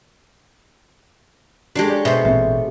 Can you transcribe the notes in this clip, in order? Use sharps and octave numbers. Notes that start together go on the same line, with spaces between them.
G#3 D4 F#4 G4 A4 C#5 C7
D5
B2 C5 E5
A1 A#2 C4 E5